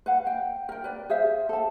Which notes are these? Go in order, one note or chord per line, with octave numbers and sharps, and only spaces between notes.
B4 F5 F#5
F5 G5
A#4 G5
B4 D5
G#4 C5 E5 F5
A4 A5